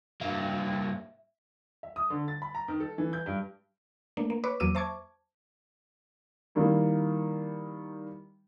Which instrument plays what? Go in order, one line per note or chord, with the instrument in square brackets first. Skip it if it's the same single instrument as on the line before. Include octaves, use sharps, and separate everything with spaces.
[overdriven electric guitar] G2 A#3 [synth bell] E5
[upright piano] E5
D#6
D3
A6
B5
A#5
D#3
A4
E3
G6
G2
[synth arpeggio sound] A3 A#3 D4
A#3
B4 C#5 D6
E2 F#3 A#3 D6 E6 D#7
C5 E5 A5 C#6 D6 G#6
[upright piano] D#3 G3 A#3 E4